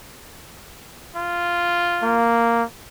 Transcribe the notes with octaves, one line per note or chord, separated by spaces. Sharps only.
F4
A#3